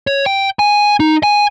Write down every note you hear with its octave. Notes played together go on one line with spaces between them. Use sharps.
C#5
G5
G#5
D#4
G#5